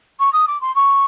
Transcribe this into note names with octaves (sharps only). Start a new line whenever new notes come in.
C#6
D#6
D6
C6
C#6